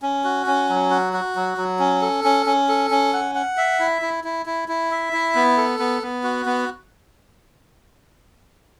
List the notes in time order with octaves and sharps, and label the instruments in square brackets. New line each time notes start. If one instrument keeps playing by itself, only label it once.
[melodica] C#4
F#4
C#4
F#3
F#4
F#4
F#3
F#3
C#4
A4
C#4
C#4
A4
C#4
F#5
F#5
E5
E4
E4
E4
E4
E4
E5
E4
B3
A4
B3
B3
F#4
B3